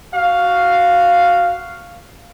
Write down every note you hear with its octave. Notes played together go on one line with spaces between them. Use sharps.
F#4 F5